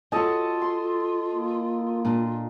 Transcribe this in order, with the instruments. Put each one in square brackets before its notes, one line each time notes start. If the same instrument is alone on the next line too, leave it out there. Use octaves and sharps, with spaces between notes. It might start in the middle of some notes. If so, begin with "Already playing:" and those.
[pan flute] F4 [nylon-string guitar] F#4 C#5 [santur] A4 D#5 A5
[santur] C6
[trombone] A#3
[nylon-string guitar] A#2 D4